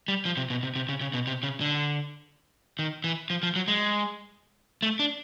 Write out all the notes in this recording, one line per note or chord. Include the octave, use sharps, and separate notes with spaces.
G3
F3
C3
B2
C3
C3
C#3
C#3
B2
C3
C#3
D3
D#3
E3
F3
F3
F#3
G#3
A3
D4